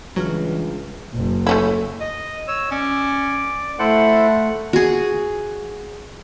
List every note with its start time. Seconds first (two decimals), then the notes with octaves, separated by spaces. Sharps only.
0.16 C#2 E3 F#3 G3 D4 F6
1.14 F#1
1.47 A3 C#4 E4
2.01 D#5
2.48 C#5 E6
2.71 C#4 D5
3.79 A3 E4 A4 C5 F#5
4.73 F#4 G#4